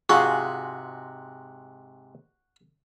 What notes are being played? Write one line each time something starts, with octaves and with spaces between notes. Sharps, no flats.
G#2 C3 G#3 F4 F#4 G#4 C#6